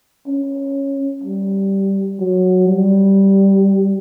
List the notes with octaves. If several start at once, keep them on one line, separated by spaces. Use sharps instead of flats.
C#4
G3
F#3
G3